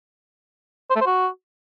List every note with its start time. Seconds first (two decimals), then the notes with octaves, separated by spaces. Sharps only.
0.90 C5
0.96 A3
1.01 C5
1.06 F#4